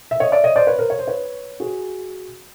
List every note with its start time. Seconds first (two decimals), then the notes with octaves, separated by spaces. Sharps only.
0.11 E5
0.20 C#5 D#5
0.32 D5 E5
0.44 C#5 D#5
0.56 C5 D5
0.67 B4 C#5
0.79 A#4 C5
0.90 C#5
0.99 C5
1.08 B4 C#5
1.60 F#4 G#4